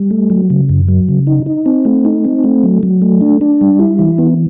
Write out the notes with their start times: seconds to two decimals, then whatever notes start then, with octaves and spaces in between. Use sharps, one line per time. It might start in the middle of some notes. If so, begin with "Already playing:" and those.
Already playing: G3
0.11 A3
0.30 F#3
0.50 C#3
0.69 F#2
0.88 F#3
1.09 C#3
1.27 D#4
1.46 D#4
1.66 C4
1.85 A3
2.05 D#4
2.25 C4
2.44 A3
2.64 F#3
2.83 F#3
3.02 A3
3.21 D4
3.41 D4
3.61 G3
3.80 E4
3.99 E3
4.18 B3